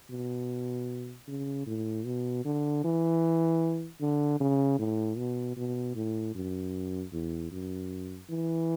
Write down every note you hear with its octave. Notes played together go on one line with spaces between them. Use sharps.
B2
C#3
A2
B2
D3
E3
D3
C#3
A2
B2
B2
A2
F#2
E2
F#2
E3